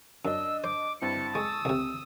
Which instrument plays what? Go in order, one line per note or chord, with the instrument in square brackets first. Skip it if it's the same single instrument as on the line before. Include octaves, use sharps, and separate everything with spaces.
[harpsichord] F#2 [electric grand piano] D4 D#5 [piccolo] E6
[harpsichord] C5 [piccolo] D6
[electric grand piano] G2 C4 E4 [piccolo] A5 [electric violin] C#7
[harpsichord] G#3 [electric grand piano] C#6 [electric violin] D#6 E6
[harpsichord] C2 C3